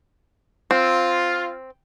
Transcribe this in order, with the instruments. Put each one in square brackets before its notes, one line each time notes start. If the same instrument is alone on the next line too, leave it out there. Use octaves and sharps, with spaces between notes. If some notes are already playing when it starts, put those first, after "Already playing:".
[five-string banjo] C4 [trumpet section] F4